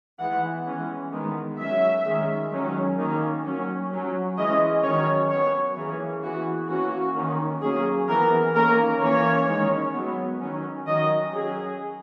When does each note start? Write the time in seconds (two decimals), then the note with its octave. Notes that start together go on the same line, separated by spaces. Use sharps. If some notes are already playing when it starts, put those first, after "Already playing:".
0.19 E3 G#3 B3 F#5
0.66 E3 G#3 C#4
1.12 D#3 G#3 B3
1.59 F#3 C#4 E5
2.05 D#3 G#3 C#4
2.52 D#3 F#3 C#4
2.98 D#3 A#3 C#4
3.44 F#3 C#4
3.91 F#3 C#4
4.37 E3 G#3 C#4 D#5
4.83 D#3 F#3 C#4 C#5
5.30 F#3 B3 C#5
5.76 E3 A#3 C#4 G#4
6.23 E3 B3 F#4
6.69 E3 A#3 C#4 F#4
7.15 D#3 A#3 C#4
7.62 F#3 A#3 C#4 G#4
8.08 E3 B3 A#4
8.54 D#3 A#3 C#4 A#4
9.01 E3 A#3 C#4 C#5
9.47 D#3 G#3 C#4
9.93 F#3 B3
10.40 D#3 F#3 C#4
10.86 D#3 F#3 C#4 D#5
11.33 F#3 C#4 G#4